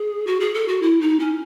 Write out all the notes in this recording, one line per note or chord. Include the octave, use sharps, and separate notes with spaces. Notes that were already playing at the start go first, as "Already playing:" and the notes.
Already playing: G#4
F#4
G#4
A4
F#4
E4
D#4
C#4